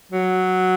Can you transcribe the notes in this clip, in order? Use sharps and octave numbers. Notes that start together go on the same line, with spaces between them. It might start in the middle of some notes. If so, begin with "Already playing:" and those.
F#3